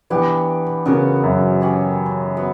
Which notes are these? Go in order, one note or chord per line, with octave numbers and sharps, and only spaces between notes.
E3 B3 D4 G4
C#3 B3 F#4 A#4
F#2
C#4 G4 C#5
B3 F#4